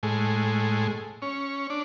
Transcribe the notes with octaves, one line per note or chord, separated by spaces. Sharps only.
A2 G#3
C#4
D4